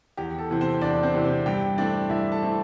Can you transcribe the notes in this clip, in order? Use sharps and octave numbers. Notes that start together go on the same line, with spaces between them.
E2 G4
A4
C3 E3 C4
C4 C5
E2 D4 D5
C4 C5
C3 E3 C4
C4 C5
G2 G4 G5
E3 A3 C4 D4 D5
G2 E4 E5
A4 A5
E3 A3 C4